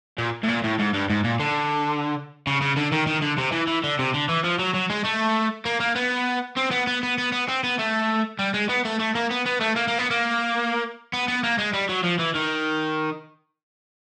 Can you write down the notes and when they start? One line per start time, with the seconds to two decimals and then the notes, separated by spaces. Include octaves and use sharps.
0.18 A#2
0.44 A2
0.49 A#2
0.64 A2
0.79 G#2
0.94 G2
1.10 G#2
1.24 A#2
1.40 D3
2.47 C#3
2.61 C#3
2.77 D3
2.92 D#3
3.07 D#3
3.22 D3
3.38 C3
3.52 E3
3.67 E3
3.84 D3
3.99 C3
4.14 D3
4.29 E3
4.44 F3
4.59 F#3
4.74 F#3
4.90 G#3
5.04 A3
5.65 A#3
5.80 A#3
5.95 B3
6.57 C4
6.71 B3
6.87 B3
7.03 B3
7.18 B3
7.32 B3
7.49 C4
7.64 B3
7.79 A3
8.39 G3
8.54 G#3
8.69 B3
8.85 A3
9.00 A3
9.15 A#3
9.30 B3
9.45 B3
9.60 A3
9.76 A#3
9.88 A#3
9.98 B3
10.11 A#3
11.13 B3
11.28 B3
11.44 A#3
11.58 G#3
11.73 G3
11.89 F#3
12.03 F3
12.19 E3
12.34 D#3